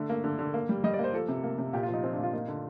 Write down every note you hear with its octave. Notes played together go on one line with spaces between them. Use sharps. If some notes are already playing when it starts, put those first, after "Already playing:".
Already playing: D3 A3
A#3
D3
D3
A#3
G3
G3 D#5
D5
A#3
C5
F3 A4
C3
A#3
C3
A#2 G4
F4
F3 D#4
F3 C4
D4
A#2
F4
A#3 D#4
D3